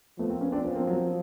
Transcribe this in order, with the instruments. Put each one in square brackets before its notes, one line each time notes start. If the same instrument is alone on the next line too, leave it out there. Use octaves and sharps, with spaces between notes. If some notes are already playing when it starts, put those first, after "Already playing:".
[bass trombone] F3 [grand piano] A3 B3
[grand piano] A#3 C4
B3 C#4
C4 D4
[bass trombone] F3 [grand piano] B3 C#4
[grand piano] A#3 C4
F#3